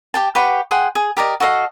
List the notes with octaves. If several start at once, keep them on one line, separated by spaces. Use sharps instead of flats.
G4 G5 A5
G4 B4 F#5 C#6
G#4 F#5 G5 C6
G#4
G4 A#4 D5 D#5
F#4 A4 D#5 F5